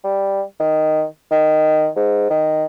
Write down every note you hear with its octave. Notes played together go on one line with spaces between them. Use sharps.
G3
D#3
D#3
G#2
D#3